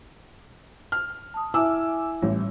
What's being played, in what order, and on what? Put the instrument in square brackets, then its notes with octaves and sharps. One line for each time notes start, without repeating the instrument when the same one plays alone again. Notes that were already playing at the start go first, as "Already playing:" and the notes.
[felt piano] F6
[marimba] A5 D#6
[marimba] E4 E5 [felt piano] G#5 D6 E6
[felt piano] A1 [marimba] G3